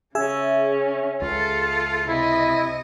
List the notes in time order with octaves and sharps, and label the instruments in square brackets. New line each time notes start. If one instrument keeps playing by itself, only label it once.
[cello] C#3 [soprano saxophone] C#4 [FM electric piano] G#4 E5
[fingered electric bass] C#2 [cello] F4 A4
[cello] C3 D#5 [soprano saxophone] E4